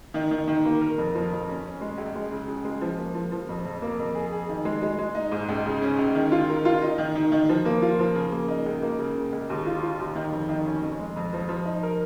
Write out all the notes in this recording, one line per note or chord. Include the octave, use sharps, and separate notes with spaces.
D#3
D#3
D#3
A#3
A#4
F2
F3
F2
C#4
C#4
G#3
C#2
G#3
C#3
C#3
G#3
F3
A#3
F3
F3
F2
F2
A#3
F2
G#4
G#4
D#3
G#3
G#3
G#3
D#4
G#2
C#2
C#3
C#4
C#2
D#3
F4
A#4
F4
D#4
D#3
D#3
D#3
F3
A#3
F4
F3
C#3
A#3
D#4
C#2
A#3
C#3
C#3
C#2
D#2
F4
F4
D#2
D#3
F2
D#3
C#4
F2
G#3
F2
F3
F3
D#4
A#4